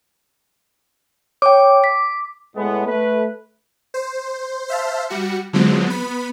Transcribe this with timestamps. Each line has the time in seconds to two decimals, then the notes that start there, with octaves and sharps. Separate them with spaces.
1.42 C#5 G5 D6
1.84 B6
2.56 A2 G#3 A3 B3
2.86 A3 B4
3.94 C5
4.68 C5 E5 F5 A5
5.10 G3 F#4 C#7
5.53 D3 F3 F#3 G#3 B3 C4
5.86 B3 B5